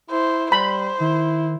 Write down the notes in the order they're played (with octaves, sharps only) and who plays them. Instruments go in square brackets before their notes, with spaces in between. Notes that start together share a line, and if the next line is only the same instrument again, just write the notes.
[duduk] E4 [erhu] C5
[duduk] G3 [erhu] C5 [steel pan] B5
[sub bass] D#3 [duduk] E4